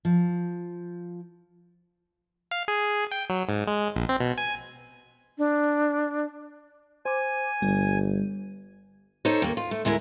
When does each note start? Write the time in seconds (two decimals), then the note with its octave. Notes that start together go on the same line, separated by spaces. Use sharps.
0.05 F3
2.51 F5
2.68 G#4
3.11 G5
3.30 F#3
3.49 G#2
3.67 G#3
3.96 A#1
4.09 C4
4.20 B2
4.38 G#5
5.38 D4
7.05 C5 G#5 D6
7.62 G1 G3
9.25 D#4 A4 C5 C#5
9.42 D#2 A#3
9.57 F4
9.71 A3
9.85 D2 G#3 E4 A#4